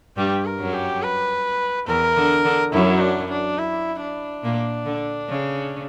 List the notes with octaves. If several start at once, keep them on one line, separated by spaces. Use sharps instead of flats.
G2 G3 G4
A#4
F#2 F#3
G4
B4
E2 E3 A#4
D3
D3
F#2 F#3 E4
D4
D4
E4
D4
A#2 A#3
D3
C#3